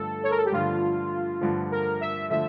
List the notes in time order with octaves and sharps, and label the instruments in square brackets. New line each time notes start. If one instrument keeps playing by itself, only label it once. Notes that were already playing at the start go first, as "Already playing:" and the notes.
Already playing: [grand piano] G2 D3 F3 A3 [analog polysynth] A4
[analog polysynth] C#5
A#4
A4
G4
[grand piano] G2 D3 F3 A3 [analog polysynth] F4
[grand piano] G2 D3 F3 A3
[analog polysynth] A#4
E5
[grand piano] D3 F3 A3 [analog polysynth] E5